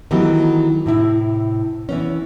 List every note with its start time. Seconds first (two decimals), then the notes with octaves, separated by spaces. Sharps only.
0.11 D#3 E3 F#3 A3 B3 G4
0.86 A2 C3 E4
1.89 E3 B3 C#4